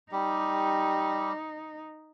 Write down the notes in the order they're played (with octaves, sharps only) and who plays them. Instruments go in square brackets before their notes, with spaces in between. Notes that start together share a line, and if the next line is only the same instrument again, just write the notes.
[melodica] G3 G4 [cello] D#4